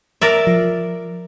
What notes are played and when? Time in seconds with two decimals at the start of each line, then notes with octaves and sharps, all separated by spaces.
0.21 A#4 D5 E5
0.47 F3